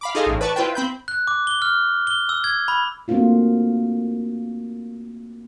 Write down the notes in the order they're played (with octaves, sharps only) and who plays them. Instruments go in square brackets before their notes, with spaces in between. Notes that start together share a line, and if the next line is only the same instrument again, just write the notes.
[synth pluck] F5 B5 D6
D#4 F4 G#4 A4 D#5 F5
A1 A2
B4 D5 A5 C#6
E4 F4 B4 C5 G5
C4 B5 G6
[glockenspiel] F#6
D6
G7
F6
G7
E6
G#6
B5
[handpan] A3 A#3 C4 D4 F4 F#4